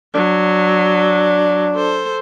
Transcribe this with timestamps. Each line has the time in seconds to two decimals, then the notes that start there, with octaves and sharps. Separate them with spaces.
0.15 F#3 D4
1.75 A4 C5